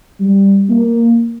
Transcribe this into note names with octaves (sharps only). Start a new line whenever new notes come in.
G3
A#3